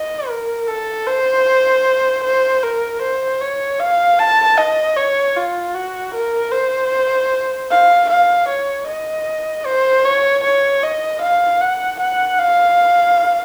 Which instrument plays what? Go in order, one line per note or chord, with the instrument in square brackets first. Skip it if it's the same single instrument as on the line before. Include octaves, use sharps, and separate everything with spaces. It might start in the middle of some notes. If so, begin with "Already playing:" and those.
Already playing: [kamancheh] D#5
A#4
A4
C5
C5
A#4
C5
C#5
F5
A5
D#5
C#5
F4
F#4
A#4
C5
F5
F5
C#5
D#5
C5
C#5
C#5
D#5
F5
F#5
F#5
F5